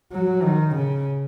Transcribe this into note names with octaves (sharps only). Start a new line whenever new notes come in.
F#3
D#3
C#3